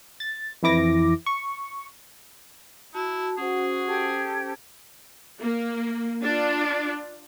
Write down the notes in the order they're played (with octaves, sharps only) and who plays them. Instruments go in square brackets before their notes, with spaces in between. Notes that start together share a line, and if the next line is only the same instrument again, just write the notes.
[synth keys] A6
F2 E3 E4 D6 A#6
C#6
[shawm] E4 [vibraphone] F#4 A5
[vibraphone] C#4 C5 [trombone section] F#4 [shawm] G#4
[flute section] G4 A4 G#6
[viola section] A#3
D4 F4